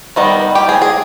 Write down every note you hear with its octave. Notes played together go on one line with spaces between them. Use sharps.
D#3 G3 B3 D#4
G4
G#4
G#4